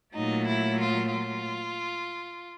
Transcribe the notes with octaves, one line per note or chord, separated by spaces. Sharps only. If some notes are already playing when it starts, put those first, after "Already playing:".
A#2 F#3 A3 D#4
E4
F4
F4